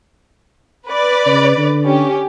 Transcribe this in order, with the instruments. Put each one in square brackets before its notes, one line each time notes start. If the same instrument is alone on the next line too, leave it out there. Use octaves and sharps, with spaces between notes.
[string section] B4 D5
[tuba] C#3
D3
[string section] C#4 G4